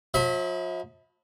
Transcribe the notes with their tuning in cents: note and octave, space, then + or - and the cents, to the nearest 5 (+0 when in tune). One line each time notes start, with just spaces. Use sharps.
F3 +40 E5 -40 B5 +0